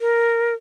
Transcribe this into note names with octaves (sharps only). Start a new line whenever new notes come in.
A#4